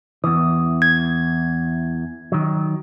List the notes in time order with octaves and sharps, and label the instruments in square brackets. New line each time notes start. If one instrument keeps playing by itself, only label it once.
[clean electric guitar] E2 E3 [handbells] D#6
[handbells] G#6
[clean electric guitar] D#3 F#3